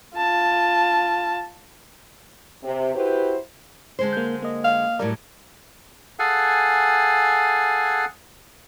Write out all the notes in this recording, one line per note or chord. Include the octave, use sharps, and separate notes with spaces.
F4 A5
C3
E4 F#4 G4 B4 C5
D3 G#3 C5
A#3 G6
A#3 D#5
F5
A2 F#3 G3 A#4 D5
G#4 A4 F5 F#5 G#5